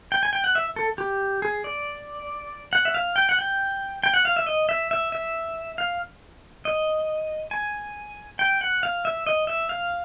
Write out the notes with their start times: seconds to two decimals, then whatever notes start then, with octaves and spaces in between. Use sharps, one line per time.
0.12 G5
0.23 G#5
0.33 G5
0.44 F#5
0.55 E5
0.76 A4
0.98 G4
1.42 G#4
1.64 D5
2.73 F#5
2.85 E5
2.94 F5
3.16 G5
3.29 F#5
3.39 G5
4.03 G5
4.14 F#5
4.25 F5
4.36 E5
4.46 D#5
4.69 E5
4.91 E5
5.12 E5
5.78 F5
6.65 D#5
7.51 G#5
8.39 G5
8.61 F#5
8.83 F5
9.05 E5
9.27 D#5
9.47 E5
9.69 F5